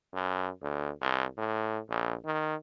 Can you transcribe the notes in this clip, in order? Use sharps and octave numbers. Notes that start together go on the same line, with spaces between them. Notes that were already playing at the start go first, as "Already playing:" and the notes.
F#2
D2
C2
A2
A#1
D#3